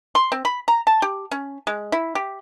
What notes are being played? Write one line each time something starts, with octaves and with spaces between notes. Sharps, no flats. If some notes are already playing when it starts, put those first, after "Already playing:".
C6
C4
B5
A#5
A5
G4
C#4
G#3
E4
G4